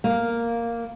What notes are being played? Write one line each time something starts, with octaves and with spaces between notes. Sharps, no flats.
A#3